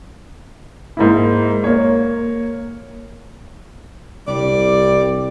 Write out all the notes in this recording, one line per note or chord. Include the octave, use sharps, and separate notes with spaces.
G#2 A#3 E4
A#3 C#5
C2 G3 D5